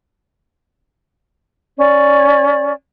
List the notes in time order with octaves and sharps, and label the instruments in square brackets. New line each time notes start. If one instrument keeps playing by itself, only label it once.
[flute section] C#4 D5